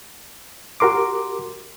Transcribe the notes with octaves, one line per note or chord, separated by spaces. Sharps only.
F#4 G4 A#4 C6 D6